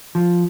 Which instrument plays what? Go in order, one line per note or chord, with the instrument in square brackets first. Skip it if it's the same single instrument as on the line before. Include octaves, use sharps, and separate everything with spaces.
[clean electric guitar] F3